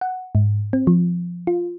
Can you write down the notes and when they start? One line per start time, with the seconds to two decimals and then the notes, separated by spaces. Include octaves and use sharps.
0.01 F#5
0.35 G#2
0.73 C4
0.87 F3
1.47 F4